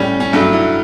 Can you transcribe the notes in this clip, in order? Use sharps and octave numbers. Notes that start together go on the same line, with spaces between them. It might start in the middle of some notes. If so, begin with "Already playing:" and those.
Already playing: A2 G3 C#4
C#4
G2 F#3 A3 D4
E4